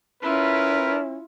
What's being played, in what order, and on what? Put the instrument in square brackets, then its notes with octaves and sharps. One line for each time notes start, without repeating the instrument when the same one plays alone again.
[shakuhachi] C#4 [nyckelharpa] E4 F4 [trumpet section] A#4 B4